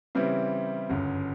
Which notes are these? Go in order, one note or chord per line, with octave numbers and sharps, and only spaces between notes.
C#3 E3 G3 C4 E4
G1 F#2 C#3